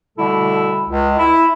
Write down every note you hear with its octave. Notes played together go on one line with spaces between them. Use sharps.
B2 D3 G3 A3 E4 A4
C#2
E4